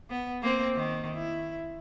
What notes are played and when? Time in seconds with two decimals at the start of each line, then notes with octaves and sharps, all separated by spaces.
0.10 B3
0.42 A#3 C4
0.76 D#3
1.14 E4